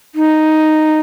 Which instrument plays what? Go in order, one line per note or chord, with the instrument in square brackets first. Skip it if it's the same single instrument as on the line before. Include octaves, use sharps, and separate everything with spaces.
[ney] D#4